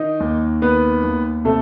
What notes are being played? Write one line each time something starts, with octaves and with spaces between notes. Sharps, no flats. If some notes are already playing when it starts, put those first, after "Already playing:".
Already playing: D#3 D#4 D#5
D#2
D#3 B3 B4
D#2
C3 A3 A4